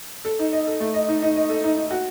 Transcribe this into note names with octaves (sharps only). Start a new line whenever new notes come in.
A4
D#4
D#5
A4
A3
D#5
D#4
D#4
D#5
A4
D#4
D#4
F#4